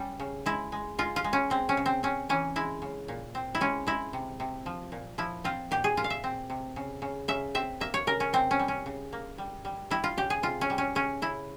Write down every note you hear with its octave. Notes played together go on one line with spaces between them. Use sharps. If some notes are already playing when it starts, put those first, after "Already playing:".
Already playing: G3 C#4
C#3
G#3 E4
G#3
G#3 F4
F4
G#3
C#4
G#3 C4
C#4
C#3
C4
C4 C#4
E3 C#4
G#3 E4
C#3
A#2
C4
E4
G#3 C#4
G#3 E4
C3
C3
F3
A#2
F3 E4
C4 F4
A#2 G4
G#4
A#2 F4
F5
E5
C4
C3
C#3
C#3
C#3 E5
C4 E5
A#3 E5
C#5
C#3 A#4
C#4
C3 C4
C#4
G3
C#4
C#3
A#3
G3
G3
G3 E4
F4
C#3 G4
G#4
C3 F4
C#4
G3
C#4
C#3 C#4
C#3 E4